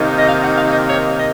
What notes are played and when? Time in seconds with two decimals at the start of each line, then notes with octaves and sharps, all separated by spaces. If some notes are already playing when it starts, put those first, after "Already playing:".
Already playing: C3 D#3 A#3 D#4
0.18 D#5
0.29 F5
0.43 F#5
0.58 F5
0.73 D#5
0.89 C#5
1.18 D#5